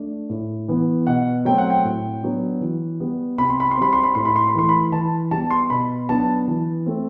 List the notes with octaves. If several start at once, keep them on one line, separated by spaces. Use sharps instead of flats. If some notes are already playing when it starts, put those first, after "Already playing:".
Already playing: A3 D4
A2
E3 B3
B2 F#5
F#3 A3 C4 G5
F#5
G5
A2
F#3 B3 D4
E3
G3 B3
C3 B5
C6
B5
C6
G3 C4 B5
C6
B5
A2 C6
B5
C6
B5
E3 A3 C6
B5
E3 A5
G3 B3 A5
C6
B2 B5
F#3 B3 D4 A5
E3
A3 C4